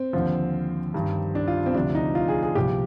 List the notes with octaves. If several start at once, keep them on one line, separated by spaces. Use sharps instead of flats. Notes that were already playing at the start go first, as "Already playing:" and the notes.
Already playing: C4
D#2 D3 F3
G2 D#3
D4
F4
C4
D2 C3 F3 D4
D#4
F4
G#4
G#4
C2 A#2 F3 G4